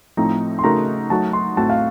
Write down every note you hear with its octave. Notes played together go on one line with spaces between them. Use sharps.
A2 F3 A3 C4 D#4 A#5
C6
C#3 A3 D#4 F#4 A#4 A#5
F#3 A3 D#4 F#4 A5
C6
A2 A3 C4 F#4 A5
F5